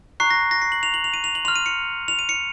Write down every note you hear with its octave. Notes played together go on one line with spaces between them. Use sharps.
A#5 C#6 F#6 C7
A#6
A#6
C7
F#7
F7
F#7
F7
D#7
F7
F#7
C6 F6 F7
D#7
C#7
F7
D#7
C#7